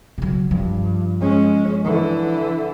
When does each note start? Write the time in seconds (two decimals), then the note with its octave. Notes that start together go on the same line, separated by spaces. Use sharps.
0.18 C#3 F#3
0.51 G2 F3
1.20 G#3 C#4
1.84 D3 E3